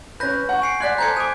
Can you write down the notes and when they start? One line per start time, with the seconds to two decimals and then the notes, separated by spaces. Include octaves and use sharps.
0.20 C#4 B4 G6 A#6
0.49 F#5 C#6
0.62 G#5 C7 C#7
0.80 D5 F#5 C6 F#6 G#6 B6
0.98 A4 C5 A#5 G6 G#6 C#7
1.17 G#5 D6 D#6